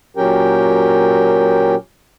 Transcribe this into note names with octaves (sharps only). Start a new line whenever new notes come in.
A#2 F#3 C#4 G4 A#4 G5